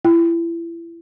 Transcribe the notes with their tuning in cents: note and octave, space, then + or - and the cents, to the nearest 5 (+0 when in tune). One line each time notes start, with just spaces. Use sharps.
E4 +30 G5 +0